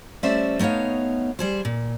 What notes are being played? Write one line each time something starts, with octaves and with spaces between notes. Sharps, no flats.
G3 A3 C#4 C5 D5 E5
A3 B3 D#4 C#5 F5
G3 G#4 C5
A#2